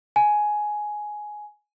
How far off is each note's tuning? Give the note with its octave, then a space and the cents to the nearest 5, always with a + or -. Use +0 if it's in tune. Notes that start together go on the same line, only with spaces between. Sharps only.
G#5 +10